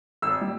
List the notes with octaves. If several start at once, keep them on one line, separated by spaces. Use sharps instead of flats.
G#1 E6
G3